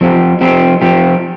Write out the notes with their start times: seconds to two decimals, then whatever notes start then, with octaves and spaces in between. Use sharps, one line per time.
0.01 F3 C4 G4
0.41 F3 C4 G4
0.82 F3 C4 G4